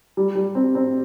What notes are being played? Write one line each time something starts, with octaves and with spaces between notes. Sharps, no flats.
G3
G3
C4
C4